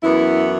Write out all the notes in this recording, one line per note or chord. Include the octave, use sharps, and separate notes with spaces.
F#2 E3 B3 E4